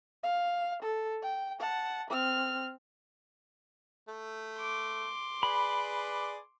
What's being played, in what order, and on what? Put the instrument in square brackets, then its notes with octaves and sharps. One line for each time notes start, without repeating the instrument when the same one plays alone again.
[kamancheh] F5
A4
G5
F#5 A5
C4 F6
[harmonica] A3
[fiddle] C6 D6
[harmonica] G#4 B4 D5 [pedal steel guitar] B5